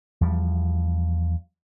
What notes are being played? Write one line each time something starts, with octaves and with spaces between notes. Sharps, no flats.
E2 F3 G3